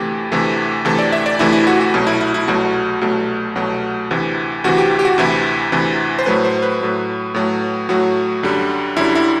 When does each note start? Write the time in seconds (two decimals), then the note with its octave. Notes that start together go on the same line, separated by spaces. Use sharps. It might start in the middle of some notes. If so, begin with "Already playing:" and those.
Already playing: D2 C3 E3 A3 G4
0.32 D2 C3 E3 A3
0.85 D2 C3 E3 A3 A4
0.99 D5
1.13 E5
1.26 D5
1.39 D2 C3 E3 A3 E4
1.53 E4
1.67 F#4
1.81 F#4
1.94 C2 B2 F#3 A3
2.07 E4
2.21 E4
2.34 E4
2.48 C2 B2 F#3 A3 F#4
3.01 C2 B2 F#3 A3
3.55 C2 B2 F#3 A3
4.11 D2 C3 E3
4.64 D2 C3 E3 F#4
4.78 G4
4.99 G4
5.05 F#4
5.18 D2 C3 E3 E4
5.72 D2 C3 E3
6.19 C5
6.26 A2 F#3 A3 B4
6.45 C5
6.62 B4
6.81 A2 F#3 A3
7.34 A2 F#3 A3
7.89 A2 F#3 A3 F#4
8.43 F#2 D3 G3
8.97 F#2 D3 G3 E4
9.15 E4